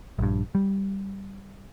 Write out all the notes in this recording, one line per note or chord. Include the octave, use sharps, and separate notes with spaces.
A#1 G2
G3